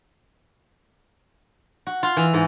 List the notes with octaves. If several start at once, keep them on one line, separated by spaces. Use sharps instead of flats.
F#4
F4
E3
G#2